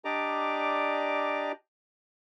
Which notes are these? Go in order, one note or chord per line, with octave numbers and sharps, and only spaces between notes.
D4 G4 D5 D#5 A#5 D6